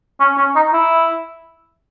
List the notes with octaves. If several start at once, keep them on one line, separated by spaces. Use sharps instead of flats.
C#4
C#4
D#4
E4